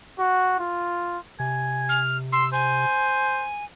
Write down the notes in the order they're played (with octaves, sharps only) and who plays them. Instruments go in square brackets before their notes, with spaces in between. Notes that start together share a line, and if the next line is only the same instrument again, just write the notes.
[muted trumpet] F#4
F4
[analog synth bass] C3 [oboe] G#5
[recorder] F6
[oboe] C6 [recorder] E6
[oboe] C5 [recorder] G#5